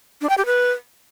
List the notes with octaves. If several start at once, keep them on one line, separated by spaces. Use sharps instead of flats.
D4
G5
G4
B4